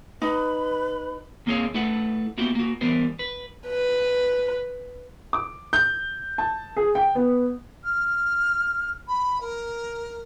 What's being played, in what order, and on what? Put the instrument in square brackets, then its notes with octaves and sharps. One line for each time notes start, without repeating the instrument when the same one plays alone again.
[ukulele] D#4 [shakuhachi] B4 [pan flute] B5
[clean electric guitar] D#2 A#3 C4 G#4 C#5 F5
A3 E4 A4 B4 F#5
A#3 B3 E4 F#4 G4
A#3 F#4
E3 G3 B3 A#4 C5
B4
[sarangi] B4
[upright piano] D6
G6
A5
G#4
G5
B3
[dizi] F6
B5
A#4